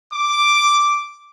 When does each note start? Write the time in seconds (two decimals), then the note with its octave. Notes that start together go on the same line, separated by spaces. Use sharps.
0.14 D6